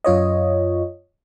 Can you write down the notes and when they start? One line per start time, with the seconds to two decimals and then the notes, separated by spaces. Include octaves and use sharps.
0.04 F#2 F4 C#5 D#5